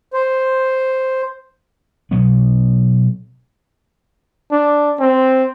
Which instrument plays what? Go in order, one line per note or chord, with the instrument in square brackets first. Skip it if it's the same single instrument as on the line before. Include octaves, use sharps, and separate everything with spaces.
[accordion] C5
[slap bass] B2 F#3 B3
[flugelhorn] D4
C4